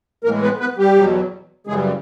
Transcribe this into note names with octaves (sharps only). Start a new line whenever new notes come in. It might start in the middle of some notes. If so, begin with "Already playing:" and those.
A2 E3 G#3 A#3 A#4
B3 B4
B3 B4
G3 G4
E2 B2 F#3
F#2 C#3 E3 G3 G#3 G#4